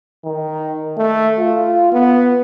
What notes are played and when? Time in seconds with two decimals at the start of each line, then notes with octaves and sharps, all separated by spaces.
0.24 D#3
0.97 A3
1.39 F4
1.92 B3